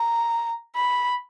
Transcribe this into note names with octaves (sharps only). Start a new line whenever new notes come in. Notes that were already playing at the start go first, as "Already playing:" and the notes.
Already playing: A#5
B5